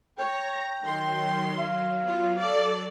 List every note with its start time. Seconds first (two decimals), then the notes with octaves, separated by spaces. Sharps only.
0.19 C#5 G5 A#5 A#6
0.83 D#3 F#3 C6
1.58 F5
2.04 B3 F4
2.39 A4 D5